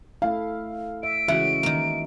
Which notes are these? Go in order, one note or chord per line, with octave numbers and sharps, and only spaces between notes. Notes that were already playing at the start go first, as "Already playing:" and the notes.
A3 E4 F5
E5 D7
C#3 E3 G#3 F#4 E5 F#5
D#3 A#3